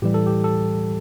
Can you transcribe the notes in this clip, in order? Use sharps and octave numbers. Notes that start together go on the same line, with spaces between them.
A2 E3 G3 G4
A4
G4
A4